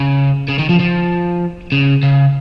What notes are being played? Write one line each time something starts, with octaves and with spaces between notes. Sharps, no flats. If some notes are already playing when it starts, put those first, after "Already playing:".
Already playing: C#3
C#3
D#3
F3
F3
C#3
C#3